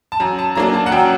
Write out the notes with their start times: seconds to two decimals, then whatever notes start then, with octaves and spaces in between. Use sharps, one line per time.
0.12 A5
0.20 F#2 A#5
0.39 A5
0.55 F#3 A#3 D4 A#5
0.74 A5
0.86 F#5
0.92 F#2 G5